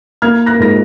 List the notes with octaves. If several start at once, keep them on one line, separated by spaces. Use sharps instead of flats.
A#3 F6 G#6
F#6 A#6
G#2 A#6